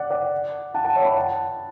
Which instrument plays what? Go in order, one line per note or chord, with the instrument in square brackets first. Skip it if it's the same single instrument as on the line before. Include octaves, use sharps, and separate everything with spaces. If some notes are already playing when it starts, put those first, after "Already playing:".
Already playing: [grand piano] D5 F#5
D5 F#5
F#5 A5
F#5 A5
C#5 E5
G5 B5
F#5 A5